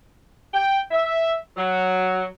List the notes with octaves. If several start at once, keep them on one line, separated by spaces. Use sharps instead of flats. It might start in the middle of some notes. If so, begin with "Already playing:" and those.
G5
E5
F#3